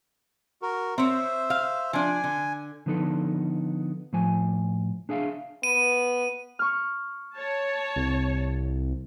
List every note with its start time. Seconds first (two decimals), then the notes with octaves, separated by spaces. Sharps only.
0.62 F#4 A#4
0.98 C4 C5 C#5 E5
1.50 F5
1.93 F3 D4 G#5
2.24 D3
2.86 D3 F3 B3 D#4 A4
4.13 A2 F3 G#5
5.09 D4 G#4 E5 F5
5.63 B3 D#7
6.59 C#6 F6
7.34 C#5 A5
7.96 C2